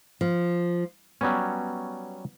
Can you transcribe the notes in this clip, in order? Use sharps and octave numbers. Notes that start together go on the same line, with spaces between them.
F3
F#3 G3 B3 C#4